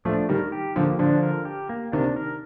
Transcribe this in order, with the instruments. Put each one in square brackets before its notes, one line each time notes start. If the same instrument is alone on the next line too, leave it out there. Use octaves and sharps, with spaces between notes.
[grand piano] F3 A3 [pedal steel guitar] D4
[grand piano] D#3 G3 [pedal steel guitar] A#4
[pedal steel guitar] G4
[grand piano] D3 F3 [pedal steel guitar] A#3
[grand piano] D3 F3 [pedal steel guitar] D4
[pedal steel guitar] A#4
G4
A#3
[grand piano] C3 D#3 [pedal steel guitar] D4
[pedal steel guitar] A#4